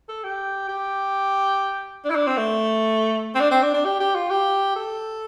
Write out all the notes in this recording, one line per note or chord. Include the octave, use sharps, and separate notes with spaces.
A4
G4
G4
D4
E4
D4
C4
A3
C4
D4
C4
D4
D4
G4
G4
F4
G4
A4